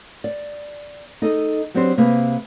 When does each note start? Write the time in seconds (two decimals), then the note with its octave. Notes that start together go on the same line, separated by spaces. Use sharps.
0.24 D5
1.22 D#4 G#4 A4 D#5
1.74 F#3 B3 C4 D4 G4 C5
1.97 C3 A#3 G#4 B4